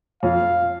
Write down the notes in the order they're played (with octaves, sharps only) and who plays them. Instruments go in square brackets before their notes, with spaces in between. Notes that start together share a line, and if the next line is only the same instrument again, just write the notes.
[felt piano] F2 [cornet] F5